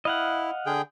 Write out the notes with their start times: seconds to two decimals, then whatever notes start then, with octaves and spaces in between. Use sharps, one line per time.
0.05 E4 D#5 F5 F#5
0.66 D3 G#4 G5